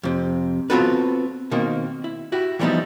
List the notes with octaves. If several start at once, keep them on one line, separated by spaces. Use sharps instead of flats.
F2 C3
B3 C4 F4 F#4 A4 B4
B2 D#3 A#3 C4
E4
E4 F#4 G4
E3 F3 G3 B3 D#4 E4